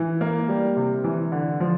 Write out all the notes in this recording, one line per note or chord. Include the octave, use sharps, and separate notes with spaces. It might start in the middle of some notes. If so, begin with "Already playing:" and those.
Already playing: E3
A#3
G3
C3
E3
D3
F3